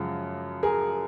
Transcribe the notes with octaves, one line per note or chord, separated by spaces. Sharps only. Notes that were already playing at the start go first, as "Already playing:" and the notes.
Already playing: F#2 C#3 F3 G#3
G#4 A#4